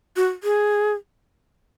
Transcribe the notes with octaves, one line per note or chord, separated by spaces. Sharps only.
F#4
G#4